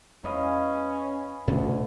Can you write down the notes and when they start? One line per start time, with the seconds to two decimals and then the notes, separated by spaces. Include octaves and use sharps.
0.24 E2 C#4 B4 D#5 F5
1.47 D2 A2 C3 C#4